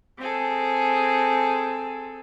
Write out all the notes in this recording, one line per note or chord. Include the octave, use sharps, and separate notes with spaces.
C4 G#4 A4